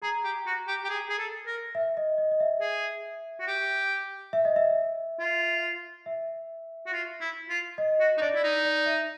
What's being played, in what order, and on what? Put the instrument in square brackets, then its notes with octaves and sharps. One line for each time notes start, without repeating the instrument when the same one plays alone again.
[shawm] G#4 [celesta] A#5
[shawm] G4
F#4
G4
G4
G#4
G#4
A4
A#4
[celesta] E5
D#5
D#5
D#5
E5
[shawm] G#4
F#4
G4
[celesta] E5
D#5
E5
[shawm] F4
[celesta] E5
[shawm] F#4
F4
E4
F4
[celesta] D#5
[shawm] F#4
D#4
[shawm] D4 [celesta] D5
[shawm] E4
D#4
[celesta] D5
E5